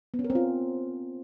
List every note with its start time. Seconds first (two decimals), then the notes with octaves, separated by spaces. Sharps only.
0.14 B3
0.19 C#4
0.24 A#4
0.30 C4
0.35 F4